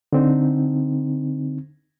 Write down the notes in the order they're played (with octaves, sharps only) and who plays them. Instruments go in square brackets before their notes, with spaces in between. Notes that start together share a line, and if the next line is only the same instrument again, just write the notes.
[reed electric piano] D3 C4 D#4